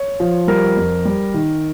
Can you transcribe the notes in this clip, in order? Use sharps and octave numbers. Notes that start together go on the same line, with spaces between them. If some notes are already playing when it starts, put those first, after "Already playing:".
Already playing: C#5
F3
G3 A#4
F2
G3
D#3